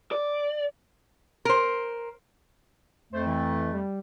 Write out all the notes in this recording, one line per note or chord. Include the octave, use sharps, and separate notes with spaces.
D5
A#4 C5
F2 A3 C5
E3
G3